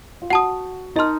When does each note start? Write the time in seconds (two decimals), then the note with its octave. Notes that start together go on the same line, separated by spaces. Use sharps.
0.22 F4
0.30 F#4 F#5 A5 D#6
0.96 D#4 A#4 D#5 A5 C6 F6